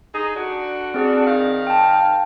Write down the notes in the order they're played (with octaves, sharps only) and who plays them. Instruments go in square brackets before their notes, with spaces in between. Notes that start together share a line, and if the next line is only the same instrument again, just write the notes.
[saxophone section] D#4 G#4
D3 D4 F#4
[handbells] C4 G#4 D5
[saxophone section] D#3 F5
[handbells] G5 A5